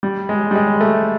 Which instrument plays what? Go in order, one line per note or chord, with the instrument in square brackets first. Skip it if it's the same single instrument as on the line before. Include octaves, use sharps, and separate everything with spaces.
[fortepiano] G3
G#3
G3
G#3
A3